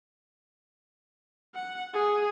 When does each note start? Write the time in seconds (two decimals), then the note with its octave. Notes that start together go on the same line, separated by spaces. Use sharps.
1.55 F#5
1.94 G#4